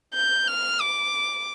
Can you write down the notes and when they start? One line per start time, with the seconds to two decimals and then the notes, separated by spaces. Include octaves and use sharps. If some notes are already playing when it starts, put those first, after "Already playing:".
0.14 G6
0.48 F6
0.81 D6